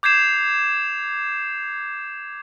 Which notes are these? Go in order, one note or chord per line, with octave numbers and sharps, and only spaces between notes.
D6 G6 G#6 C7 E7